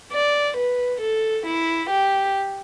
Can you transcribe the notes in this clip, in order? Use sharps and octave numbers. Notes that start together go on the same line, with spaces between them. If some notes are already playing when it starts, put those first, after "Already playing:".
D5
B4
A4
E4
G4